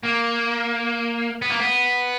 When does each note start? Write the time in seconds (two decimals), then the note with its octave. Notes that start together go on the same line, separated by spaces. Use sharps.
0.03 A#3
1.42 B3
1.50 A#3
1.60 B3